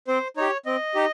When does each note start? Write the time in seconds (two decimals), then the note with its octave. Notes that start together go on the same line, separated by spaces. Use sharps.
0.07 C4 C5
0.37 D#4 G4 C#5
0.66 C4 D#5
0.95 D#4 G4